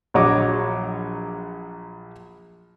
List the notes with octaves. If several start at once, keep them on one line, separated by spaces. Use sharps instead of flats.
A#1 F#3 C#5 D#5 D6